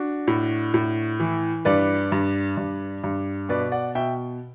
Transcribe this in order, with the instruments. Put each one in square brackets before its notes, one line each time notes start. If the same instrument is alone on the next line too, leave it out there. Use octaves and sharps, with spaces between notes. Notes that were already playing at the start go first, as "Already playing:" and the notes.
Already playing: [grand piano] D4 F#4
A2
A2
E3
G2 B4 D5
G2
G2
G2
B2 B4 D5
D5 F#5
B2 E5 G5